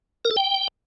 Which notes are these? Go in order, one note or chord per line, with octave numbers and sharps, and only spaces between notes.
A#4
A4
G5